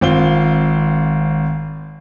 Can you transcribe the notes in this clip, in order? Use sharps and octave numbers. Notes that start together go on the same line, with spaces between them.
G#1 C4 F4 G7